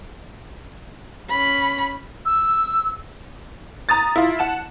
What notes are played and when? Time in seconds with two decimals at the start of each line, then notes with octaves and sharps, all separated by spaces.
1.29 C#4 B5
2.26 E6
3.89 A#5 D#6 A6
4.16 E4 F4
4.39 F#5 A5 E7